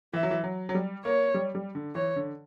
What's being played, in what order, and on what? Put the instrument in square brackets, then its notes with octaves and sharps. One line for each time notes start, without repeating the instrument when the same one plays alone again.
[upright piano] E3 [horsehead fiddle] E5
[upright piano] F#3
E3
F#3
F#3
G3
[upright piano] A#3 [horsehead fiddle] C#5
[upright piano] G3
G3
D3
[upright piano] E3 [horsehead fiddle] C#5
[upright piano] D3